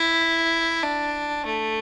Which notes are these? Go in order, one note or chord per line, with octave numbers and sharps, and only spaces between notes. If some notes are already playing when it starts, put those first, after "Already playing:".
Already playing: E4
D4
A3